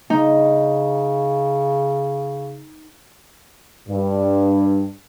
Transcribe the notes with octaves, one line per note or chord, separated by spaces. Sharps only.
C#3 D#4
G2